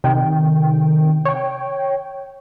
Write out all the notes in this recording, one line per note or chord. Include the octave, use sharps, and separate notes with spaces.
C3 D#3 G5
C#5 G5